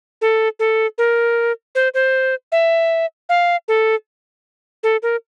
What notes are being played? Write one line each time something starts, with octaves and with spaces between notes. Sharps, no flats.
A4
A4
A#4
C5
C5
E5
F5
A4
A4
A#4